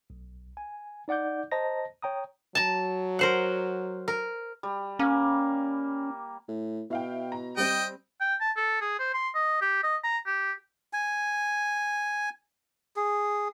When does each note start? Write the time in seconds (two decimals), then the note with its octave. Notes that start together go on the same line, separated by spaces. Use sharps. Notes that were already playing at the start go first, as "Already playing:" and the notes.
0.10 B1
0.57 G#5
1.08 D#4 D5 F#5 D6 G6
1.52 C5 D#5 A5 A#5 A#6
2.02 C#5 G5 A#5 D#6
2.55 F#3 A5 A#5
3.19 A#4 C5 F#5
4.08 A#4
4.63 G3
4.99 A#3 C#4
6.48 A2
6.90 B2 E4 F5 G5
7.32 A#5
7.57 G3 C4 D#5 G5
8.21 G5
8.41 A5
8.57 A4
8.81 G#4
8.99 C5
9.14 C6
9.35 D#5
9.61 G4
9.84 D#5
10.04 A#5
10.27 G4
10.93 G#5
12.96 G#4